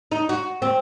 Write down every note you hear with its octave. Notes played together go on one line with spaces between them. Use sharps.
D#4
F#4
C4